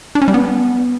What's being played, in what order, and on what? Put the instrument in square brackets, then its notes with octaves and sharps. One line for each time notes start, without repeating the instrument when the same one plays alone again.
[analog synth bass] D4
C#4
G3
B3